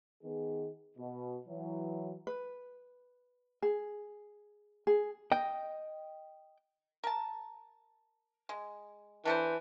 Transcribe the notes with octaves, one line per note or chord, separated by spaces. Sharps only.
D#3 B3 G#4
B2
E3 F#3
B4
G#4
G#4
D#5 G5
A#4 A5
G#3
E3 D4 A4 C5